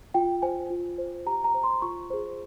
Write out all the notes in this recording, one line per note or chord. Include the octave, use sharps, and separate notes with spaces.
F4 G5
C5 G#5
F4
C5
G4 A#5
A#5
C5
C6
F4 C#6
G#4 C5